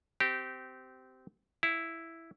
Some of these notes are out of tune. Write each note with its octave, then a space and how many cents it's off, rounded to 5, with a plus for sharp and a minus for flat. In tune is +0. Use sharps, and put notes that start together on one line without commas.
C4 -15 G4 -20
E4 +0 F5 +25